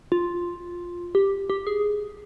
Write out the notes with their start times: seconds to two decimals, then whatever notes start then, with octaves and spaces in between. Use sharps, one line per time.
0.12 F4
1.15 G4
1.50 G4
1.67 G#4